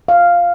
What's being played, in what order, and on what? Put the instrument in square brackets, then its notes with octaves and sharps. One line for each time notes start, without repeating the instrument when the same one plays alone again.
[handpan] F5